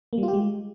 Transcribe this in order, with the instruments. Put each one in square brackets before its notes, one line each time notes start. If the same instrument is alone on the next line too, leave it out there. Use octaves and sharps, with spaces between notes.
[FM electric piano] A#3
G3
F4
G4
G#3